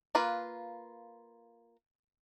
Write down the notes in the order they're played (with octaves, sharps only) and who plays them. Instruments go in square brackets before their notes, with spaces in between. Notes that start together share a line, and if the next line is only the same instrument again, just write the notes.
[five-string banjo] A#3 F4 B4